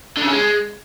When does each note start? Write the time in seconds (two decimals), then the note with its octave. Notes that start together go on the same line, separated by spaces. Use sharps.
0.17 D3
0.22 C#3
0.28 C#4
0.33 G#3